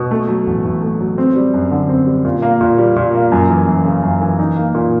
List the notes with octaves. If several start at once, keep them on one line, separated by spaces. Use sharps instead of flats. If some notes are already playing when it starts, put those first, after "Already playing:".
Already playing: B2
A3
F#3
A1
A2
A3
F#3
C4
G3
F#2
D3
C4
G3
A#2
A#3
A#2
G3
A#2
A#3
F#2
E3
F#2
C#3
F#2
E3
D#4
A#3
A#2